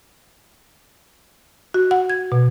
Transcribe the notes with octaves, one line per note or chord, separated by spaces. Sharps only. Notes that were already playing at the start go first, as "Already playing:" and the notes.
F#4
F#5
G#6
B2